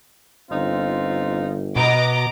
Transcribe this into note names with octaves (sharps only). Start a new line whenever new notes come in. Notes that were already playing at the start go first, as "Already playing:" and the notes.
G1 C4 D#4 F4
B2 B3 D#5 A#5 D6